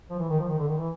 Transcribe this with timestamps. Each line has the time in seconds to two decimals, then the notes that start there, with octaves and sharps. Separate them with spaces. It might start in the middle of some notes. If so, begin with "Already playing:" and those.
0.10 F3
0.19 E3
0.29 D#3
0.39 F3
0.49 D#3
0.58 D3
0.68 D#3
0.78 E3